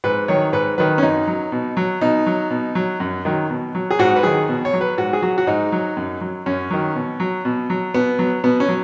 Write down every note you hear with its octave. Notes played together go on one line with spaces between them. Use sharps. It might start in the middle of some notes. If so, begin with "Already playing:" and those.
G#2 B4
D#3 F#3 C#5
G#2 B4
D#3 F#3 B4
C#4
F#2 D#4
F#3
B2
F#3
B2 D#4
F#3
B2
F#3
F#2
D#3 F#3
B2
F#3
G#4
G#2 F#4
B4
D#3 F#3 G#4
B2
C#5
F#3
B4
G#2 F#4
G#4
F#3 F#4
F#4
G#2 D#4
F#3
F#2
F#3
F#2 C#4
D#3 F#3
B2
F#3
B2
F#3
B2 B3
F#3
B2 B3
C#4
F#3